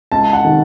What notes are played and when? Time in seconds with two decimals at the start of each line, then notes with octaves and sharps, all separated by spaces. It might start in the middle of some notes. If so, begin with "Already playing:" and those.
0.12 C#2 A5
0.33 F#5
0.44 C3 D#3